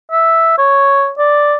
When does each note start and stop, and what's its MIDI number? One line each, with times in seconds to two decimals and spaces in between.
0.11 0.55 76
0.58 1.11 73
1.18 1.57 74